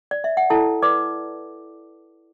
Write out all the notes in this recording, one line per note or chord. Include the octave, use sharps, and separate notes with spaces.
D5
E5
F#5
E4 A4 A5
B4 D5 D6